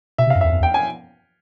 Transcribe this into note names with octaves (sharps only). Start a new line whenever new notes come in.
B2 E5
C3
F5
F#2
E2 E5
F2
E2
G5
G#5